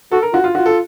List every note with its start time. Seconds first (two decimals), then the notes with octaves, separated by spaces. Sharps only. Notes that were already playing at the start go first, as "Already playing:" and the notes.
0.12 F#4 A4
0.22 A#4
0.33 F4 F#4
0.44 F4
0.55 F4 F#4
0.66 A4